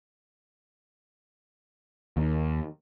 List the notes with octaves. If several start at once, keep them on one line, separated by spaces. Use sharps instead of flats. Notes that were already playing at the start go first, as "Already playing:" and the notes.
D#2